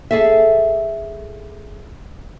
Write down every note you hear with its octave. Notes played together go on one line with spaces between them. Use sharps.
G#4 A4 E5